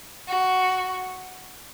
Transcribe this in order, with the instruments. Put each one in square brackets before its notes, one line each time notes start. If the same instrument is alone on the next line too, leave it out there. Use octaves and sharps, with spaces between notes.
[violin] F#4